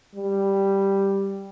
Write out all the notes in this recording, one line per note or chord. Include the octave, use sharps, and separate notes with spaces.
G3